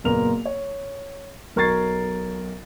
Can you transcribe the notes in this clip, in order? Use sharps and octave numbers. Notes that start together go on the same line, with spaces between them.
F#1 A#2 B3 A#4 F7
C#5
B1 A#4 C#6 G#6 A6 C7